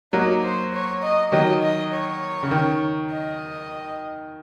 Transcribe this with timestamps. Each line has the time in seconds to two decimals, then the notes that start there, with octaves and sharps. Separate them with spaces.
0.13 F#3 A#3 D#4
0.43 C5
0.73 C#5
1.03 D#5
1.32 D#3 F#3 D#5
1.62 D#5
1.92 C#5
2.43 C#3
2.51 D#3
3.11 D#5